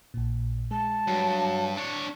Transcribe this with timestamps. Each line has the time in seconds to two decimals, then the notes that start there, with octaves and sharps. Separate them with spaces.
0.14 A#1 A#2
0.71 G#3 A5
1.08 G2 F#3
1.77 D4 C#5